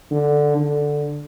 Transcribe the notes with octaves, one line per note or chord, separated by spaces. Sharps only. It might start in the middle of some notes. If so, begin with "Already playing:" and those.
D3
D3